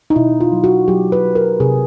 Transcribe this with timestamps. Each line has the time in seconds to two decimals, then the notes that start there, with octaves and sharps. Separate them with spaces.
0.10 D#4
0.16 B2 E4
0.40 F4
0.52 F#3
0.64 F#4
0.88 F#3 G4
1.12 B4
1.24 F#3
1.35 A#4
1.60 C3 G#4